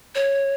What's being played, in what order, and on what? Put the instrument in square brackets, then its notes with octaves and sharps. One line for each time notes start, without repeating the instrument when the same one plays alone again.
[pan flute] C#5